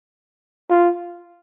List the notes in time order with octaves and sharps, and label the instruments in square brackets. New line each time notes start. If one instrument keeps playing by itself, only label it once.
[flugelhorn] F4